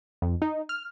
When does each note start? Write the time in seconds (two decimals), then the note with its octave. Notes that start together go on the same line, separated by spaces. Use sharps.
0.22 F2
0.42 D#4
0.69 F6